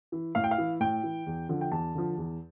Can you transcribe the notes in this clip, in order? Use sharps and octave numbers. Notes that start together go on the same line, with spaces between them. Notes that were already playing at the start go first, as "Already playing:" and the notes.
E3
A2 F5
G5
F5
E3
A2 G5
E3
E2
D3 F3
G5
E2 A5
D3 F3
E2